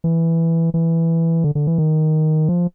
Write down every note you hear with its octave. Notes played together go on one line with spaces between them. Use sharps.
E3
E3
D3
D3
E3
D#3
F3